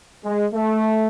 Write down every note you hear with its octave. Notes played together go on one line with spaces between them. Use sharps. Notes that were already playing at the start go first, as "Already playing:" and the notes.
G#3
A3